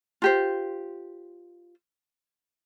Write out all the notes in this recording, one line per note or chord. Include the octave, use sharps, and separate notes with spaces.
F4 G4 C5